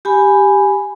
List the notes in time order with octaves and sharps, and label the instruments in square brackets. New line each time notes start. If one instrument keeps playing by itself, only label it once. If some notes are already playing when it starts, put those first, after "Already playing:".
[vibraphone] G4 G#5 B5